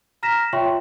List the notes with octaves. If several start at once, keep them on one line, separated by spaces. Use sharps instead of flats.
A#5 F6 A#6 B6 E7
F4 C#5 E5 G5 C6 C#6